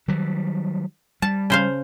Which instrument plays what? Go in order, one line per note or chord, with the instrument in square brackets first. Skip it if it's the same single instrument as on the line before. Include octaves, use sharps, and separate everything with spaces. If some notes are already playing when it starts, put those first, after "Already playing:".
[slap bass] D#3 F#3 G3
[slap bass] G3 [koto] A5
[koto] C#3 C5 F5